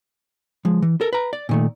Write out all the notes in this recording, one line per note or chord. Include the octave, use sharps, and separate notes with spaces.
F3 G#3
E3
A4 A#4
B4 A#5
D5
A#2 D#3 A3